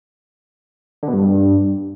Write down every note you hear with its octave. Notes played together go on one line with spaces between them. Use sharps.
D3
B2
G2